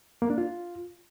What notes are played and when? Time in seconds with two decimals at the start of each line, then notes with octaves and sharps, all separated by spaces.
0.22 A#3
0.30 D4
0.38 F4